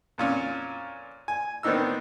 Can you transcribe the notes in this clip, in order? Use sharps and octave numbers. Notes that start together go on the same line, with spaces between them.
F2 A#2 C#4
G#5
D#3 B3 C4 D4 D#4 E6